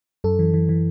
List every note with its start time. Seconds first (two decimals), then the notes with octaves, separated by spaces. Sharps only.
0.24 F#2 A4
0.39 E3
0.54 E3
0.69 E3